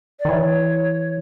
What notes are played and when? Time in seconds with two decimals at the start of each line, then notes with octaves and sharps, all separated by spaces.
0.20 D5
0.25 D#3
0.28 E3 C#5